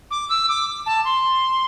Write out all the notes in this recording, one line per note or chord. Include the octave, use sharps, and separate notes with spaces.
D6
E6
D6
A5
C6